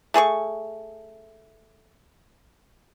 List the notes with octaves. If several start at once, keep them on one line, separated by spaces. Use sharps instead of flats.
A3 G#4 C6 C#6